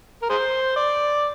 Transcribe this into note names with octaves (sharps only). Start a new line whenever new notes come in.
A#4
G#4 C5
D5